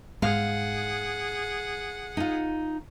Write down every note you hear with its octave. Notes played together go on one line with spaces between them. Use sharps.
G#2 G#3 G#4 F5 F#5
D#4 F4